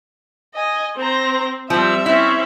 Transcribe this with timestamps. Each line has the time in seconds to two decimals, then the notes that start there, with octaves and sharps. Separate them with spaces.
0.55 D#5 G#5
0.97 C4 C5 A#5
1.70 F3 G3 C4 E5
2.06 C4 C#4 E4